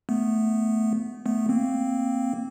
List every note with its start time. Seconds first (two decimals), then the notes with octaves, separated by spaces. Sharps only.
0.09 A3 B3
1.26 A3 B3
1.49 A#3 C4